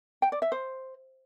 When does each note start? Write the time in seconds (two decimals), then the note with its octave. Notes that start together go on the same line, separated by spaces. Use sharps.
0.22 G5
0.32 D5
0.42 E5
0.52 C5